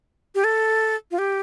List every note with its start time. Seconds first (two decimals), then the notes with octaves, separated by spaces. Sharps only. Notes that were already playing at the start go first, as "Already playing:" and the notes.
0.35 G4
0.44 A4
1.11 F4
1.18 G4